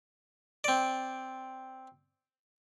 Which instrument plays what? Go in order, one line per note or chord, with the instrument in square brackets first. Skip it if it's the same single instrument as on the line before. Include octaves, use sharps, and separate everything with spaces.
[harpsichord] C4 D5